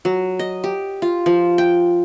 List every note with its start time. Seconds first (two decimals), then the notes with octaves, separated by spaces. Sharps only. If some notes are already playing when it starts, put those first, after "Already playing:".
0.05 F#3
0.39 D#5
0.64 G4
1.02 F4
1.26 F3
1.58 G5